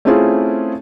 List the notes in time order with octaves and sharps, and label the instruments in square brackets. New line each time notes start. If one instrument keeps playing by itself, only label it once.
[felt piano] A3 C4 C#4 E4 F4 G#4